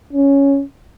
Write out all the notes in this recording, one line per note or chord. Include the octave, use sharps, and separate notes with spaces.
C#4